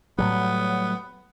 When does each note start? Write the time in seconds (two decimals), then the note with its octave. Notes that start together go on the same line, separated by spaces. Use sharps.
0.18 A2 F#3 G3 B3